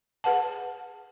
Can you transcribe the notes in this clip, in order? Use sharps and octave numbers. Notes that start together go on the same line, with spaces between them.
G#4 B4 F#5 A5